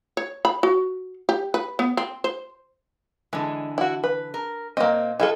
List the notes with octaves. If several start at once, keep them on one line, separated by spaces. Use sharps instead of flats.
C#5
B5
F#4
G4
B4
B3
C4
C5
D3 E3 G#3
E4 F#4
B4
A#4
A#2 A#3 C4 D#5
G#3 E4 F4 A4